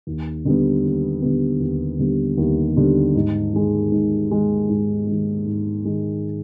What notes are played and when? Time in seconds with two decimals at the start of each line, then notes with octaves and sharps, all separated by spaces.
0.07 D#2
0.45 D3 G3 B3
0.83 D#2
1.22 D3 G3 B3
1.60 D#2
1.99 D3 G3 B3
2.37 D#2
2.77 D3 G3 B3
3.15 G#2
3.53 D#3 G#3
3.92 G#2
4.31 D#3 G#3
4.69 G#2
5.07 D#3 G#3
5.46 G#2
5.85 D#3 G#3